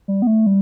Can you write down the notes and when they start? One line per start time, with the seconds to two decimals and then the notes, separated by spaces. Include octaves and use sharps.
0.08 G3
0.22 B3
0.27 A3
0.46 G3